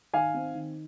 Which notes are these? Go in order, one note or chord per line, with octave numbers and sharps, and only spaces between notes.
D#3 F5 G#5
C4
D#3